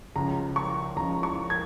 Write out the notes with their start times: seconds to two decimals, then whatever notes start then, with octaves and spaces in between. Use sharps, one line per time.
0.16 C#2 C#3 F3 A#5
0.56 C#6
0.96 C#2 C#3 F3 A#5
1.23 C#6
1.50 G#6